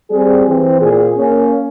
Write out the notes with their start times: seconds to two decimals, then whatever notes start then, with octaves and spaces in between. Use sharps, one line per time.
0.11 G3 C4 G#4
0.47 E3 C4
0.80 A#2 G#4
1.16 A#3 C#4